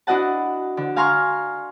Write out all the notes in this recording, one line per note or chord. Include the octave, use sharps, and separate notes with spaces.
D4 E4 F#4 D#5 F#5 A5
D3
F5 G#5 A#5 C6 C#6 F6